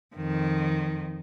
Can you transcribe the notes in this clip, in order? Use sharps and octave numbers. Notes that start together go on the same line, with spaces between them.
F2 D#3